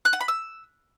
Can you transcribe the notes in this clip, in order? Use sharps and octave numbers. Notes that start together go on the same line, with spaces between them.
F#6
F#5
B5
E6